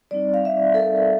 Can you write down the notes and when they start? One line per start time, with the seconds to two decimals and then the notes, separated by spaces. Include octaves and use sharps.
0.11 G3 C4 D#4 D5
0.34 F5
0.45 E5
0.74 A4
0.79 A#4
0.96 A4